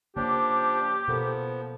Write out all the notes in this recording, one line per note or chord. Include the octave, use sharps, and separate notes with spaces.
C#3 F3 A#3 D4 G4 C#5
B2 F3 B3 A4 A#4